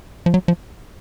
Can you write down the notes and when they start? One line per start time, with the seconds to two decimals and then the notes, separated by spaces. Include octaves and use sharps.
0.26 F3
0.34 F#3
0.48 F3